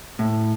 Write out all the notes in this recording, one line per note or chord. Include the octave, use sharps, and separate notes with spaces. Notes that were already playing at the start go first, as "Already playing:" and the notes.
A2